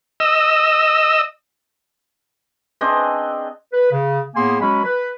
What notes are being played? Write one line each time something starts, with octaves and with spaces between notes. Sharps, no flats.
D#5 E6
C4 D4 G#4 D#5
B4
C#3
A2 A#3 B3 G#4 G#5 C6
F#3 G#3 C#4 F#4 B5
B4